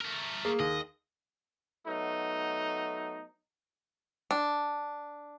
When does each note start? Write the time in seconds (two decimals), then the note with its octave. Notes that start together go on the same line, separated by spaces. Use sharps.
0.01 A3 A#4
0.45 A#3 G#4
0.59 D#2 D#5
1.86 F#3 A3 B3 D#4
4.31 D4